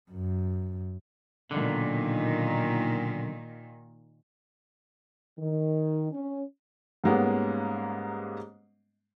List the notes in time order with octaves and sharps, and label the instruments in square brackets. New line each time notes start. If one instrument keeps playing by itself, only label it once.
[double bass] F#2
[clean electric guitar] B1 D3 [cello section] A#2 D#3
[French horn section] D#3
C#4
[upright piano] G#2 G3 G#3 A#3 B3 C#4